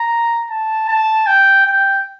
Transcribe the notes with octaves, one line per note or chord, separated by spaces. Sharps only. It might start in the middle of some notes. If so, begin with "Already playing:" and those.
Already playing: A#5
A5
A5
G5
G5